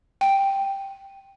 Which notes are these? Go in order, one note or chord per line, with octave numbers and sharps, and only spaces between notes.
G5